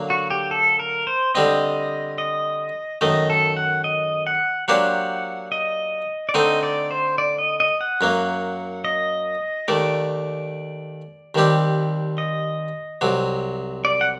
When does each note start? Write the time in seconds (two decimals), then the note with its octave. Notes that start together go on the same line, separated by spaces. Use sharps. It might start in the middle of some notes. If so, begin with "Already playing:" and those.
Already playing: D3 F#3 A#3
0.10 F#4
0.30 G4
0.51 A4
0.79 A#4
1.07 C5
1.35 D3 G3 C4 D#5
2.18 D#5
3.01 F#2 D#3 A3 D#5
3.30 A4
3.57 F#5
3.84 D#5
4.27 F#5
4.68 F#3 A#3 D4 G4 C5 F#5
5.52 D#5
6.29 D5
6.34 D3 A3 C4 D#4 D#5
6.63 D5
6.91 C5
7.18 D5
7.38 D#5
7.60 D#5
7.81 F#5
8.01 F#2 F#3 A#3
8.85 D#5
9.68 D#2 D#3 A3 D5
11.35 D#2 D#3 G3 C4 G4
12.18 D#5
13.01 C2 C3 F#3
13.85 D5
14.01 F#5